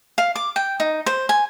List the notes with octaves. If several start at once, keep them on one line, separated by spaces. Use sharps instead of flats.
F5
D6
G5
D#4
C5
G#5